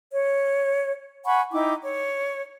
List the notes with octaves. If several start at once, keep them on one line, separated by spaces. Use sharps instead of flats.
C#5
F#5 G#5 B5 C#6
D#4 E4 G5 D6
C#5